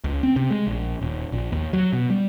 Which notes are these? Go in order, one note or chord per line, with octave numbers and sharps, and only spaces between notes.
C#2
C4
C3
G#3
A#1
D#1
A#1
D#2
F#3
B2
G3